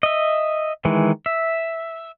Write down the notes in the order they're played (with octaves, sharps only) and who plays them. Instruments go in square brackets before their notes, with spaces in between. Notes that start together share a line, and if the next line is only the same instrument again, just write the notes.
[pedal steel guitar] D#5 E5
D#3 E3 G#3
E5